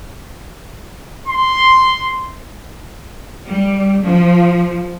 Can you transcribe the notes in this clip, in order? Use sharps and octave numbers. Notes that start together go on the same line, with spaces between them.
C6
G3
F3